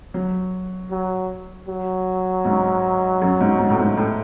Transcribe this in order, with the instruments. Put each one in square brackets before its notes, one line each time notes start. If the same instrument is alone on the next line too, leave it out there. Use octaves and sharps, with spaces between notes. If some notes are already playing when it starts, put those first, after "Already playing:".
[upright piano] F#3
[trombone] F#3
F#3
[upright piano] G#2
F#2
G#2
G#2
A2
G#2
A2